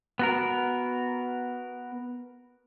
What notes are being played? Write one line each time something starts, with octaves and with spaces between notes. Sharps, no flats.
B3 F#4 A#4